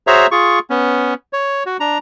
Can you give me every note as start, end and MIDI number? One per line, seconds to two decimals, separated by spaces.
0.07 0.27 66
0.07 0.27 68
0.07 0.27 72
0.07 0.27 73
0.07 0.27 76
0.07 0.27 82
0.31 0.59 65
0.31 0.59 68
0.31 0.59 85
0.70 1.14 59
0.70 1.14 61
1.33 1.64 73
1.66 1.77 66
1.80 1.98 62
1.80 1.98 82